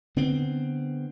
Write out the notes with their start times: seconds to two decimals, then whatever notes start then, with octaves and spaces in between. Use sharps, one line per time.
0.16 D3 B3 C4